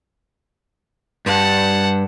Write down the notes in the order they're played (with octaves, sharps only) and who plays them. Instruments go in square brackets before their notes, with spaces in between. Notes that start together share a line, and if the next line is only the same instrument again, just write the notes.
[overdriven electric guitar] G2 [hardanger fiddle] F#5 A5